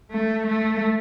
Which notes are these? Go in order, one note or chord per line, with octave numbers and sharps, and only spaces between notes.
A3
A3